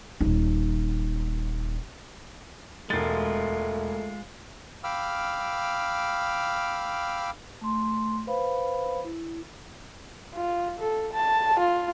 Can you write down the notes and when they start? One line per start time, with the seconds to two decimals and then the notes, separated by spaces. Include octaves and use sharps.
0.21 D#1 D#4
2.90 E1 G#3 A3 F4 A6
4.84 F5 G5 B5 D6 E6 F6
7.61 A3 C6
8.27 B4 C5 F5 B5
9.04 E4
10.34 F4
10.79 A4
11.13 A5
11.59 F4